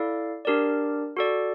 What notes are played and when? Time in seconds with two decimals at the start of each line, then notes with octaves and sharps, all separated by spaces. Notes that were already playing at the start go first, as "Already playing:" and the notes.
Already playing: E4 A4 D5 F5
0.45 D4 G4 A#4 D5
1.17 F#4 A4 D5